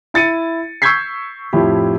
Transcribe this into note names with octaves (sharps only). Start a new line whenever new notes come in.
E4 A6 C#7 D#7
C#6 E6 G6 G#6 B6 C7
F2 A2 E4 G4